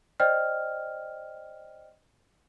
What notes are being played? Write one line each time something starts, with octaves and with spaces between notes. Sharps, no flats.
C5 D5 D#5 G5 F6